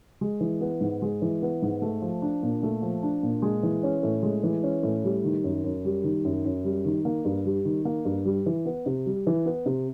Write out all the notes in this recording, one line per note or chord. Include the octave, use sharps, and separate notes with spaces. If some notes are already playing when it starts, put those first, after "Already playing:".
G#3
E3
B3
G#2
G#3
E3
B3
G#2
A3
F3
D4
A#2
A3
F3
D4
A#2
G#3
E3
C#4
A2
G#3
E3
C#4
A2
G3
D#3
F#2
F#2
G3
D#3
F#2
F#2
G3
D#3
A#3
G2
G3
D#3
A#3
G2
G3
E3
B3
C3
G3
E3
B3
C3